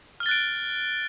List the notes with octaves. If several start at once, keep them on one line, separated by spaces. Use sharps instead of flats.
F6 F#6 A6 D7 G7